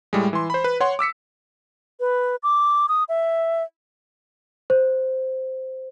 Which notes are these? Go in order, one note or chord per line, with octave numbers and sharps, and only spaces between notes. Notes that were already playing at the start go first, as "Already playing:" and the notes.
A2 G3 G#3
E3 C6
C5 B5
B4
C#5 F#5 C6
D6 E6 B6 C#7
B4
D6
D#6
E5
C5